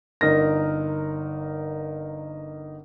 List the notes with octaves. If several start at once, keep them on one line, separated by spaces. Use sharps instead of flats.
G1 D#4 A#4 A#6